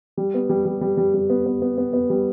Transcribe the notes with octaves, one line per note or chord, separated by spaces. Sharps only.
G3
B3
G3
G3
G3
G3
G3
B3
B3
B3
B3
B3
G3